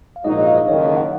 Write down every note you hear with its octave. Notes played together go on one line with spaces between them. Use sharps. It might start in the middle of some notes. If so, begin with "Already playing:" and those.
F5
A#1 G#2 F#3 A#3 D#4 D#5
F5
D#5
F#1 F2 D#3 C#5
D#5
F#5